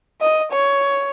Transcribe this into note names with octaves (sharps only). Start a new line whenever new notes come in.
D#5
C#5